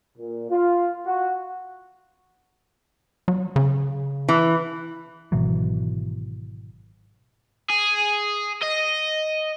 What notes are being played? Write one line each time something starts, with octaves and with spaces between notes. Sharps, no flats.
A#2
F4
F#4
F#3
C#3
E3
G#1 B2 E3 F#3
G#4
D#5